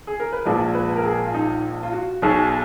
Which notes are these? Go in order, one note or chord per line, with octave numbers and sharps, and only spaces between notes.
G#4
A#4
B4
A#1 A#2 F3 G#3 D5
B4
A#4
G#4
F4
D#4
F4
F#4
B1 B2 F#3 G#4